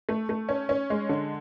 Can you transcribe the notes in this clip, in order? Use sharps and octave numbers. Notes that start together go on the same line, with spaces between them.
A3
A3
C#4
C#4
G#3
D3